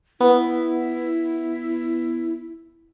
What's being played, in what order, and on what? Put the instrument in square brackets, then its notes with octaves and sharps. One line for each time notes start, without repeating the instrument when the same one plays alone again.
[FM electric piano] B3 [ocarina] E4